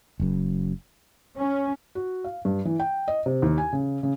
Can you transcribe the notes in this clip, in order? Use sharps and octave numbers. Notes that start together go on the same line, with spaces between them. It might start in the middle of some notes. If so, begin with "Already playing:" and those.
F#1 F#2
C#4
F#4
F5
G2
E3
G5
D#5
C3
D#2
G#5
C#3
C#3